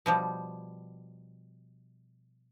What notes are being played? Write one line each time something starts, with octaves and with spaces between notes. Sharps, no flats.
B2 F3 G3